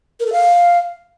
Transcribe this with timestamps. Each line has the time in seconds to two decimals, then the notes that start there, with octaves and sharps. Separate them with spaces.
0.20 A#4
0.26 A4
0.33 F5